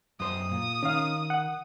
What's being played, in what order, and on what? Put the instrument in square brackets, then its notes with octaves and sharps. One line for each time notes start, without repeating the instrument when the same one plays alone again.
[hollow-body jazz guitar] F#2 C5 [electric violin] D#6
[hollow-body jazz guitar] A#2
[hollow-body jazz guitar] D#3 [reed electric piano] C#4 F5
[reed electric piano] F#5